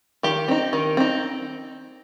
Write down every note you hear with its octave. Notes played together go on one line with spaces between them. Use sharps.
D#3 G4
C4 D#4
D#3
C4 D#4